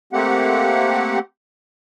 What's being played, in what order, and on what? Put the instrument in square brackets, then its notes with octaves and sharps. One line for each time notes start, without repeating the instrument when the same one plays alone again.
[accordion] A3 A#3 C4 G4 F#5